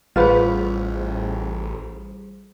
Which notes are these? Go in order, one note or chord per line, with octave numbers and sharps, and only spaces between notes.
A1 G3 F4 G#4 B4 C5